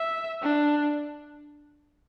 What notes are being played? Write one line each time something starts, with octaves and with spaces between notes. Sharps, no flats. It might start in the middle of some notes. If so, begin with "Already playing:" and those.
Already playing: E5
D4